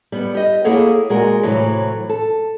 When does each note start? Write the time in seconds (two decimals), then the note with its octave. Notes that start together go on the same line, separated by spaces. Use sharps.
0.12 G3 B3
0.35 G4 D#5
0.64 A#3 E4 G#4 A4 C#5 F#5
1.10 A#2 G#3 F#4 A#4
1.43 A2 C3 E3 F#3
2.09 A4